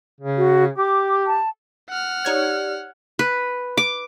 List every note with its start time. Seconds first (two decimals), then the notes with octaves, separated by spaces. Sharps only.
0.20 C#3
0.37 F#4
0.77 G4 D6
1.27 A5
1.89 F#5 F6
2.25 D#4 G4 C#5 D5 G#6
3.19 B4
3.77 D6